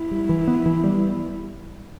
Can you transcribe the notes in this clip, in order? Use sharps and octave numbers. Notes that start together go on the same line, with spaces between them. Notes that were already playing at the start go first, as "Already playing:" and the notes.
Already playing: E4
G3
E3
B3
E3
G3